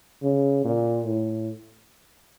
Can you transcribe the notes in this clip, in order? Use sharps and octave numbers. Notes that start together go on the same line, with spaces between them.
C#3
A#2
A2